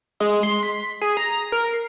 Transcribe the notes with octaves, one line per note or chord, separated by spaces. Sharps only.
G#3
C6
B6
G#4
A#5
A#4
C7